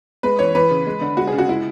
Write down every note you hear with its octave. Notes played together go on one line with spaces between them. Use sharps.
G#3 B4
E3 C#5
E3 B4
C#3
G#3
D3
G#3 F#4
G#4
C#3
F#4
G#3 E4